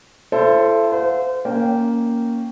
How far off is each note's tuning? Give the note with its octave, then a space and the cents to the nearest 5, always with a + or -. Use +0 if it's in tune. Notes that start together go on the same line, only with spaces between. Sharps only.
E4 +45 A4 +0 C5 +0
C5 -30 F5 +35
A#3 +0 C#4 +5 G5 -10